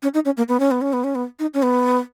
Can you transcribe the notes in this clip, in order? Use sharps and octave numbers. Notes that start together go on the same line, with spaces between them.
C#4
D#4
C#4
A#3
B3
C#4
B3
C#4
B3
C#4
B3
D#4
C#4
B3